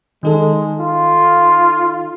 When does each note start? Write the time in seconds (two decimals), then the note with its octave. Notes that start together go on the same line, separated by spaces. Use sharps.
0.23 D#3 G#3 D#4 A4
0.80 F4